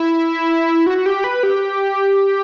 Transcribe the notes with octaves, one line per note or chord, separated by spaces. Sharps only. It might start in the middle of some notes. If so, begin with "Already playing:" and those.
Already playing: E4
F#4
G4
B4
G4